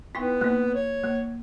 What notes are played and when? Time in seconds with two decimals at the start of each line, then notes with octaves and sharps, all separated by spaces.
0.15 B3 D#4 E4 G5
0.41 A#3 D#4
0.75 C#5
1.04 A#3